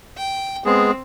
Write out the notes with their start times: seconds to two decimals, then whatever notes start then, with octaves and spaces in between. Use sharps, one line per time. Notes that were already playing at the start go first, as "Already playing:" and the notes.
0.17 G5
0.65 G#3 B3 C4 G#4